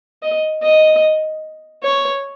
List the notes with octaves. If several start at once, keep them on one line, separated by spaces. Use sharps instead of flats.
D#5
D#5
C#5